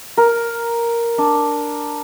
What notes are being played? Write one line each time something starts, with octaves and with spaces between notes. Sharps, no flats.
A#4
D4